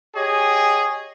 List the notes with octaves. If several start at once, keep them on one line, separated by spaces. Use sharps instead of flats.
G4 G#4 C#5 D#5 G#5